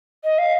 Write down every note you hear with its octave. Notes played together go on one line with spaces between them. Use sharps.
D#5
F5